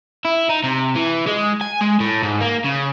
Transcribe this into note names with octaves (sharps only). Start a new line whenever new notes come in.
E4
D#4
C3
E3
G#3
G#5
G#3
A2
G#2
A#3
C#3